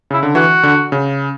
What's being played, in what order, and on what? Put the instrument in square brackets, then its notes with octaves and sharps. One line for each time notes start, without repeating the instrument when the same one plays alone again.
[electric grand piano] C#3 [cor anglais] E4
[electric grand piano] D3
[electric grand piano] E3 [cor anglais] F#4
[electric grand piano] D3
C#3